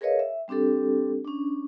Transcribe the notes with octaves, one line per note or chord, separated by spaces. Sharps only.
G#4 A#4 B4 C#5 D#5 F5
E5
G3 C4 D4 G4 A4
C#4 D4